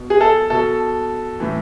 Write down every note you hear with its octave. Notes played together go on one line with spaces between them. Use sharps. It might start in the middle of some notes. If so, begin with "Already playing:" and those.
Already playing: B2
G#4
A4
B2 A4
A2 E3